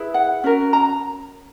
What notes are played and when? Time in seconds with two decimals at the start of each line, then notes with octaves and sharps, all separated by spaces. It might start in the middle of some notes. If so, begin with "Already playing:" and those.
Already playing: E4 G#4 B4
0.14 F#5
0.44 C#4 F#4 A#4
0.73 A#5